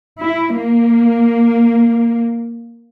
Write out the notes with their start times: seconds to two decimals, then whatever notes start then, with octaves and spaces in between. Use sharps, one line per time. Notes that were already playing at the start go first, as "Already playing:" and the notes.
0.20 E4
0.57 A#3